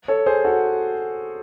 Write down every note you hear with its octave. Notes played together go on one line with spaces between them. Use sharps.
A4 C#5
G#4 C5
F#4 A4